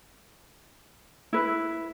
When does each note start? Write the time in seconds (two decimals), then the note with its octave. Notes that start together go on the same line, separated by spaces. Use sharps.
1.33 E4 B4